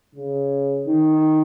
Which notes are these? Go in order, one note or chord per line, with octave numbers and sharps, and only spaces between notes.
C#3
D#3